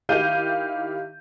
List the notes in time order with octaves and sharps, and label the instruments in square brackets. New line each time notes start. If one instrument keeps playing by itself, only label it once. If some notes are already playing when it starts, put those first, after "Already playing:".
[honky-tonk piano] D#3 E4 G4 F5 G6 D#7